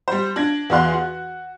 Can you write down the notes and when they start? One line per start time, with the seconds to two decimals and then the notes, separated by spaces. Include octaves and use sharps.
0.08 G3 C5
0.36 D4 G#6 A#6
0.70 E2 F#4 D5 F5 C6 F#6
0.94 F#4